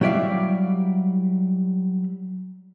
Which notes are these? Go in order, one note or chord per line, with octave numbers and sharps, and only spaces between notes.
F#3 G3 E4 D5 E5 F5